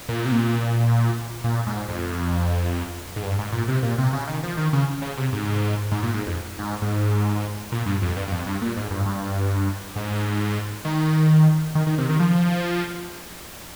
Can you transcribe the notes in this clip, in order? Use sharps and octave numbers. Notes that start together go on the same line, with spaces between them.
A#2
C3
A#2
A#2
G#2
F2
G#2
G2
G#2
A#2
C3
A#2
C3
C#3
D#3
F3
D#3
C#3
C#3
C3
G#2
G#2
A#2
G#2
F2
G#2
G#2
A#2
G2
F2
G2
G2
F2
G2
A#2
G#2
G2
G2
G#2
D#3
D#3
D#3
C3
D#3
F3